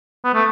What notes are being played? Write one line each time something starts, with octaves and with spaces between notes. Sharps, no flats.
B3
A3